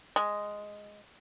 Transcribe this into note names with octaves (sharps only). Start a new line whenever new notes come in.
G#3